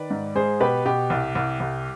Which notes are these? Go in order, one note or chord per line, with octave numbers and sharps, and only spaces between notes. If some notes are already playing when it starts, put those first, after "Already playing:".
Already playing: D#3 B4 D5
G#2
G#3 G#4 C5
B2 G4 B4
B2 G4
C2
C2
C2